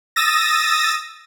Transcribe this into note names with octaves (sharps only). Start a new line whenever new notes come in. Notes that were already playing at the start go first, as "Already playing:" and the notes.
D#6 E6 A6 A#6